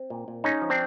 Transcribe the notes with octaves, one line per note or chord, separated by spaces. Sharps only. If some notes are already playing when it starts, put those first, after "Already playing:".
Already playing: C4
A#2
A#2
G#3 C#4 D#4
F3
C4 D4